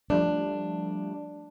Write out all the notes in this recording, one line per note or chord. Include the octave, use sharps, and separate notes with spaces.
F3 G3 A3 D4